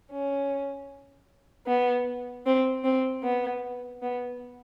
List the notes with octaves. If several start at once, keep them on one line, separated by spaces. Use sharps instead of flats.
C#4
B3
C4
C4
B3
B3